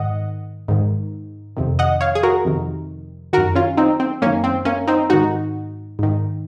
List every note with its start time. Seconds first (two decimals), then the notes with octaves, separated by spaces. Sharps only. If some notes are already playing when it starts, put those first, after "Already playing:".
Already playing: G#2 D#3 D#5 F#5
0.68 G#2 D#3
1.57 F2 C3 D#3
1.79 D#5 F#5
2.01 C#5 F5
2.15 G#4
2.23 F#4 A#4
2.45 F2 C3 D#3
3.33 D#3 F#4 A#4
3.38 F#2
3.55 C#4 F4
3.77 C4 D#4
4.00 C4
4.22 F#2 A#3 C#4
4.26 D#3
4.44 C4
4.65 A#3 C#4
4.87 C4 D#4
5.10 G#2 D#3 D#4 F#4
5.99 G#2 D#3